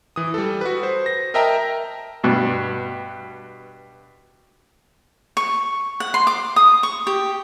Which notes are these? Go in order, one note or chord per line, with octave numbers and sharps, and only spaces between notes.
E3 D#6
G3 A4
F#4 B4
C5
A#6
A#4 D#5 E5 G5 A5 A#5
G2 B2
C#6
F#5
C6
D6
D#6
C#6
G4